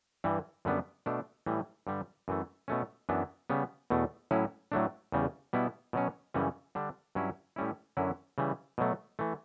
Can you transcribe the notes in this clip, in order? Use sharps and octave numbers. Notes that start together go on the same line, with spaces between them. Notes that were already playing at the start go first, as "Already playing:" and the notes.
G2 E3 G3
F#2 D3 G3 B3 D4
B2 A3 D4
A2 E3 G3
G2 D3 G3
F#2 E3 A3
B2 A3 C#4
F#2 E3 B3 D4
C#3 G3 B3
E2 B2 A3
A2 F#3 C#4 E4
A2 F#3 A3 D4
E2 C#3 G3
B2 G3 B3 E4
B2 F#3 C#4
F#2 C#3 E3 G3 C#4
D3 G3 D4
G2 F#3 C#4 E4
A2 G3 C#4 E4
F#2 D3 F#3 C#4 E4
C#3 E3 G3
B2 F#3 A3
E3 A3